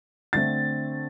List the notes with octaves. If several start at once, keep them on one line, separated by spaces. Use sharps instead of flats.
D3 A3 C4 A6